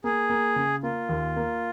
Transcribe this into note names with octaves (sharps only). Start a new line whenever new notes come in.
A#3 G#4
A#3
C#3
A#3 F4
D#2
A#3